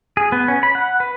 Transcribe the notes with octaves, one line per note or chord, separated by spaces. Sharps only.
G#4
B3
C#4
B5
F#5
B4